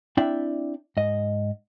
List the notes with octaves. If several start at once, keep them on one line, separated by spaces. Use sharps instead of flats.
C4 D4 E4 D5 E5 G5
G#2 D#5